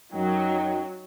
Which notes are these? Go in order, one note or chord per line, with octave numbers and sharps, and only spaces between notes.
F#2 F#3 D#4 G5